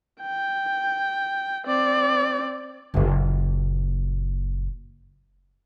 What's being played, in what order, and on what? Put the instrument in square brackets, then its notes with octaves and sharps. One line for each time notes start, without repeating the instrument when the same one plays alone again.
[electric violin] G5
C4 D5
[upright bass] F#1 A#2